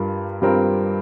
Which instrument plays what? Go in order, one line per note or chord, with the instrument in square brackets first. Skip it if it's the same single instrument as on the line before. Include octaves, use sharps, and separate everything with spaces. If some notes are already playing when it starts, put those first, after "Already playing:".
Already playing: [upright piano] G2 G3 F4 A#4
G2 G3 C4 F4 A#4